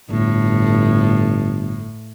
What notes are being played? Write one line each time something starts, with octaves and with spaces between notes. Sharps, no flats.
G1 A2